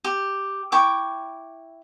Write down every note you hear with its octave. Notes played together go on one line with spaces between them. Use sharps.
G4
E4 G5 C#6 D6